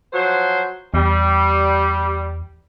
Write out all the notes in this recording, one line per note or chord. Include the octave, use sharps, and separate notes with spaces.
F3 F#3 C5
E2 G3